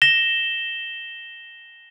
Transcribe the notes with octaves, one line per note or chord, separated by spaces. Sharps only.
A#6 E7 G7